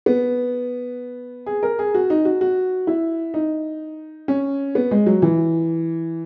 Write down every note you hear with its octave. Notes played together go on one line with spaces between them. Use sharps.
B3
G#4
A#4
G#4
F#4
D#4
F#4
F#4
E4
D#4
C#4
B3
G#3
F#3
E3